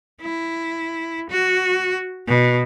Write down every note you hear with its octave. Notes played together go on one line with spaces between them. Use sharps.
E4
F#4
B2